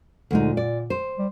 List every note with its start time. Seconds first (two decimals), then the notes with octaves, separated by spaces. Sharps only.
0.31 D2 A#2 G#3 D#4
0.57 D5
0.90 C5
1.18 G3